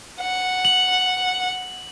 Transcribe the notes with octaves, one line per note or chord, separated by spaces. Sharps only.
F#5
F#7